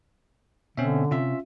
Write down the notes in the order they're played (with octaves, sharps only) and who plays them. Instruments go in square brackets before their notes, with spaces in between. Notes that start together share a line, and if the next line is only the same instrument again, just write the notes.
[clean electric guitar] B2 [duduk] D3 [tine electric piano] C4 C#4 E5
[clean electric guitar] C3 [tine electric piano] C#4 F4 E5